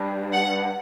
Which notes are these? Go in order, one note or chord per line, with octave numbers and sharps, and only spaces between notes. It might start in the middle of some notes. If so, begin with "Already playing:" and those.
Already playing: G2
F#5